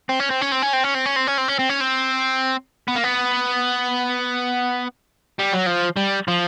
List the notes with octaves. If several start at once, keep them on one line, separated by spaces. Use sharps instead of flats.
C4
C#4
C4
C#4
C4
C#4
C4
C#4
C4
C#4
C4
C#4
C4
C#4
C4
C#4
C4
B3
A#3
B3
G3
F#3
F3
G3
F3